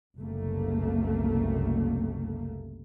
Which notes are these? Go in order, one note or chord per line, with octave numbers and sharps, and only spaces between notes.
F#1 C2 A3 A#3